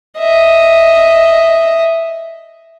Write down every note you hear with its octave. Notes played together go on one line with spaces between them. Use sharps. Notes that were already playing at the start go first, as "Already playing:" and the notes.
D#5 E5